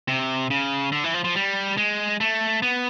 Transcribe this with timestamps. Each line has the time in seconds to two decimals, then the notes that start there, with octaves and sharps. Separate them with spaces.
0.08 C3
0.50 C#3
0.92 D3
1.04 E3
1.14 F3
1.24 F3
1.36 G3
1.77 G#3
2.20 A3
2.62 B3